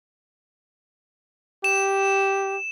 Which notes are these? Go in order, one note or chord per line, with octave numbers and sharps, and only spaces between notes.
G4 E7